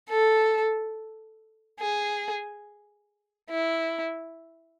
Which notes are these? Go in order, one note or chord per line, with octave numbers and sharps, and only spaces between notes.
A4
G#4
E4